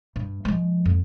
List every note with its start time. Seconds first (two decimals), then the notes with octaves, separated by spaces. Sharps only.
0.16 G2
0.45 F3 G#3
0.85 F2